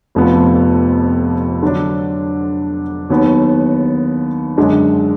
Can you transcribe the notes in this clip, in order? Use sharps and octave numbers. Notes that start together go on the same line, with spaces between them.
F1 F2 F3 B3
D3 F#3 D4
D#2 D#3 F#3 B3
F#2 D3 G#3 D4